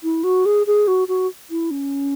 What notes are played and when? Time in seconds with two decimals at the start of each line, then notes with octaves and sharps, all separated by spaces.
0.04 E4
0.24 F#4
0.46 G#4
0.67 G#4
0.88 F#4
1.08 F#4
1.50 E4
1.71 C#4